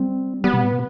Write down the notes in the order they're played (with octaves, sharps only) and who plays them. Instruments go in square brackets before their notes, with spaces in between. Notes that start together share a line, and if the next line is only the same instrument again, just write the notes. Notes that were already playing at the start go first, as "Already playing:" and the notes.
Already playing: [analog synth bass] G3 [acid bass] C4
[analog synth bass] G3 [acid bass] B3
[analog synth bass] B2
A2
B2